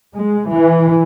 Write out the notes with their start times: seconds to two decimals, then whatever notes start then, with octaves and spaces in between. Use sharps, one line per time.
0.14 G#3
0.51 E3